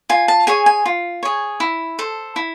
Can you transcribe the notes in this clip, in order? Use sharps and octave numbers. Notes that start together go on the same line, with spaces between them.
F4 G#5
A5
G#4 C#5 G#5
G#5
F4
G#4 C#5
E4
A4 C5
E4